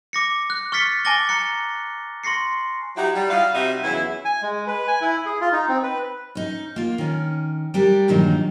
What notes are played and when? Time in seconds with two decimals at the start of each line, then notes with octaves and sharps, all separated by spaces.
0.13 D6 A#6 C#7
0.50 F#6
0.72 C#6 F6 A6 B6 C#7
1.05 G#5 A5 D6 A6 A#6 G7
1.29 A#5 F#6 C#7
2.24 C6 C#6 A#6 C7 C#7
2.97 F#3 D#4 E4 F#4 G4
3.15 G3
3.30 E4 F#4 D#5 F5
3.54 C3 G3 D#4 F#4 D#5 E5
3.84 E2 C#3 F#3 E4
4.25 G#5
4.42 G#3
4.67 B4
4.88 G#5
5.01 E4
5.26 G#4
5.41 F4
5.52 D#4
5.69 C4
5.83 B4
6.35 C#4 D#4
6.76 A#3 F4
6.98 D#3 C#4
7.74 G3 D4 G4 A#4
8.08 G2 A#2 D#3 E3 F#3 D#4